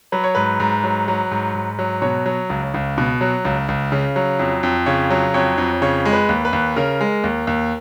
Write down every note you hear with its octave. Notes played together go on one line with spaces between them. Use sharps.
F#3 B4
C#5
G#2 B4
G#2
F#3
F#3
G#2
G#2
F#3
B2 C#5
F#3
C#2
C#2
B2
F#3
C#2
C#2
C#3
F#3
F2
F2
C#3 C#5
F#3
F2 C#5
F2
C#3 C#5
G#3
B4
D#2
B4
D#2
C#3 A#4
G#3
D#2
D#2